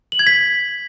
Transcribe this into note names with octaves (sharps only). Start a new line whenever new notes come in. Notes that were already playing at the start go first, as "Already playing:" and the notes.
F#7
G#6
B6